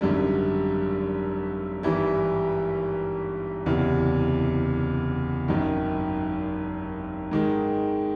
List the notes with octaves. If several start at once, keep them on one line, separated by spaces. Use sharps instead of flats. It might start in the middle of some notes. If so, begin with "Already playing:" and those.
G#1 F#2 D3 G3
G#1 G2 E3 G3
F#1 E2 C3
G#1 F#2 D#3
G#2 D#3 G#3